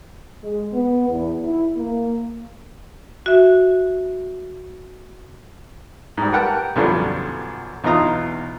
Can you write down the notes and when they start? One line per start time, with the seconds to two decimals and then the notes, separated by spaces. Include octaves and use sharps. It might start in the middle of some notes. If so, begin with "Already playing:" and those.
0.43 G#3
0.73 B3
1.09 E2
1.44 E4
1.77 A#3
3.26 F#4 E5
6.17 G#2 G3
6.32 G4 A#4 B4 F#5 G5 A5
6.76 B1 F#2 D3 F3 G3 B3
7.84 B1 E2 D#4 F4 A#5 D#6